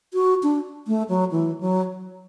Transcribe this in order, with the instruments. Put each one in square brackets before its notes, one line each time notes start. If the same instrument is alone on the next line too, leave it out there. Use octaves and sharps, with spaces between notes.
[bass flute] F#4
D4
A3
F#3
E3
F#3